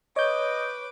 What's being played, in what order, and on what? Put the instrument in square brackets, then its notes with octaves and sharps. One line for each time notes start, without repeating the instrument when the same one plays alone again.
[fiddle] B4 D6 [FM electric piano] C#5 G6 [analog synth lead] D#5